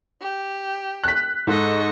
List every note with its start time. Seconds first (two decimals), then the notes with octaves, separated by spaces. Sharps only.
0.20 G4
1.04 F#6 B6
1.47 G#2 A4 D#5 C#6